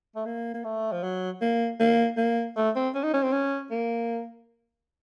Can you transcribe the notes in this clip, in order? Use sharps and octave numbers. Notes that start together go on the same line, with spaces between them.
A3
A#3
A#3
A3
F3
F#3
A#3
A#3
A#3
A3
C4
C#4
D#4
C#4
C4
C#4
A#3